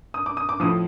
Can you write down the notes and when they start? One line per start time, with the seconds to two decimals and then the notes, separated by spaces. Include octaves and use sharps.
0.14 D#6
0.26 D6
0.37 D#6
0.49 D6
0.60 A2 F3 D#6